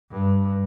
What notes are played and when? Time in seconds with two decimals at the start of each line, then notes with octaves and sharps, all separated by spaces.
0.11 G2